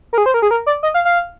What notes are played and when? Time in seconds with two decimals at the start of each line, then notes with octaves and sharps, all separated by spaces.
0.13 A#4
0.18 G#4
0.26 C5
0.34 A#4
0.42 G#4
0.51 A#4
0.67 D5
0.83 D#5
0.94 F5
1.05 F5